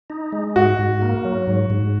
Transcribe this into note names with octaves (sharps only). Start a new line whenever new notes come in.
D#4
G#3
G#2 F#4
G#2
A#3
F#3
G#2
G#2